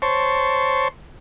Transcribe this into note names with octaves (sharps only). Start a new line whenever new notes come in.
C5 C#5 A5 C6 C#6